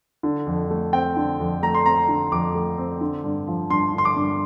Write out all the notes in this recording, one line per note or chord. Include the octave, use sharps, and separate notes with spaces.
D3
F2
A3
C4 G5
D3
F2
A3 A#5
C6
C4 A#5
D3
F2 D6
A3
C4
D3
G2
F3
G2 C6
D3 C6
D6
G2